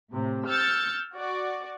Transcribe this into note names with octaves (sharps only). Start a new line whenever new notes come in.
A2 C3
E6 F6 G6 A6 C#7
F#4 D5